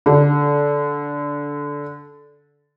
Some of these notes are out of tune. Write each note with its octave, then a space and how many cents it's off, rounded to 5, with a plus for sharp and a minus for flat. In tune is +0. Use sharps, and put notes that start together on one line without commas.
D3 -15